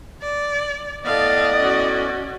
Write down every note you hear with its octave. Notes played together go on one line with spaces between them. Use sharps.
D5
A2 B3 D5 D#5 F5 A5
C#4 F#4